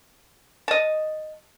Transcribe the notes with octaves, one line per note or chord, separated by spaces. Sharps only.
D#5 A5